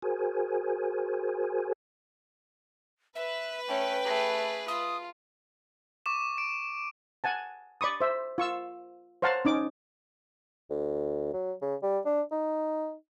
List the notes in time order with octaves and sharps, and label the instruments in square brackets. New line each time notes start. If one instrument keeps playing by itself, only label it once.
[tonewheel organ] F#4 G#4 A#4 C5 G#5
[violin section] B4 [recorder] E5
[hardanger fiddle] A3 C#4 [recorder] G5
[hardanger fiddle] A3 G#4
[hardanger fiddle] F4 [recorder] D#6
[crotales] C#6 D6 E7
D7
[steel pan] F#5 G#5 A5
D5 B5 C#6 D#6
C5 E5
F4 C#6 E6
C5 C#5 F5 F#5 A5 A#5
C#4 D#4 D6
[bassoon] D2
F#3
C#3
G3
D4
D#4